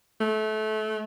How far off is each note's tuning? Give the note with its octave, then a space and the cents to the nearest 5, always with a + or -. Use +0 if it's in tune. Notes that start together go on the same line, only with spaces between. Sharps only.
A3 -25